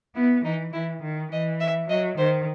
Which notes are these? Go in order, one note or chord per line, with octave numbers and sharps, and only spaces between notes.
B3 E4
E3 D#4
E3 E4
D#3
E3 D#5
E5
F#3 D#5
D#3 C5